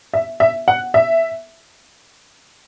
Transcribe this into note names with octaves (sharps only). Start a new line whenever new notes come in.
E5
E5
F#5
E5